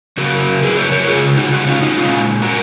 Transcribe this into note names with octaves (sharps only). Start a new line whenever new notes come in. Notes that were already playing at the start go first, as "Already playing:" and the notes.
C#3 F#3 F#4 A#4
G#4 B4
A#4 C#5
A#4 C#5
C#3 G#3 F4 G#4
D#4 F#4
D#4 F#4
C#4 F4
D#4 F#4
A#2 G#3 C#4 F4
F#4 A#4